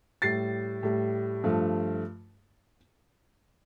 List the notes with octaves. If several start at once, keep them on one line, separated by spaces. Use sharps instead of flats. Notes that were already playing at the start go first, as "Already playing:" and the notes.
A2 G3 A6 C7
A2 G3
G2 F3 A3